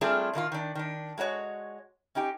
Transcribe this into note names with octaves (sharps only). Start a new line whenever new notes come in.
G3 A3 C4 D4 F4 G#4
A#2 D#3 E4 F4
D#3 D4
D#3 D4
G#3 A3 F#4 C#5 D#5
C#4 D#4 G4 G5